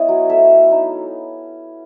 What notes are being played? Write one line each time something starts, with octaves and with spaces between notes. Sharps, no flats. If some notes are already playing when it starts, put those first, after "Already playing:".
Already playing: B3 E4 C#5 D#5
F#3
A3 E5
C#4
D#4